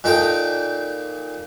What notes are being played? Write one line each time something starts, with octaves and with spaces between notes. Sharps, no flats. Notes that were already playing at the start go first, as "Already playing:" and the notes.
A#2 D#4 A4 G5